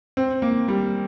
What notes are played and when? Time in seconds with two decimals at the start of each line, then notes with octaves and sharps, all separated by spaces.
0.17 C4
0.42 A#3
0.68 G3